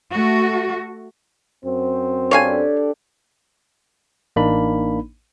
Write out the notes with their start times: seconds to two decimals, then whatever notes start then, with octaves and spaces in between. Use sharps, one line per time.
0.13 A3 F#4
1.65 F#2 C4
2.31 D4 G4 A4 C#5 F5 G#5
4.36 A1 A#3 D4 D#4 B5